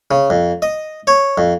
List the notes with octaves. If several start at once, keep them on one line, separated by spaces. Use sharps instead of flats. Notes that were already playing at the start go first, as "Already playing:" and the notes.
C#3
F2
D#5
C#5
F2